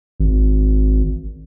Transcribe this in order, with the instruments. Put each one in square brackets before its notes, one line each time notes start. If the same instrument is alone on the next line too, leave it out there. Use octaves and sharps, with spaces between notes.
[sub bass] G#1